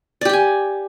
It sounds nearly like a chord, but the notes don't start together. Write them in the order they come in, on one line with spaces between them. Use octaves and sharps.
D5 G4 G5 G#5